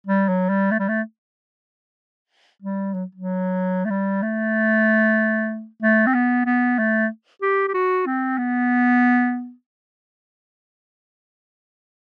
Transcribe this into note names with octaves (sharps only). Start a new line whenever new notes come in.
G3
F#3
G3
A3
G3
A3
G3
F#3
F#3
A3
G3
A3
A3
C4
B3
B3
A3
G4
G4
F#4
C4
B3